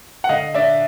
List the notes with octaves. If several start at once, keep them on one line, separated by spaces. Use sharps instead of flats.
F#5
D3 D#5 F5
D4 D5 E5